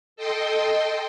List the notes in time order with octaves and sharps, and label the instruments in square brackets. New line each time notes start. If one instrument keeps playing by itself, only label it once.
[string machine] A4 D#5 G5 C6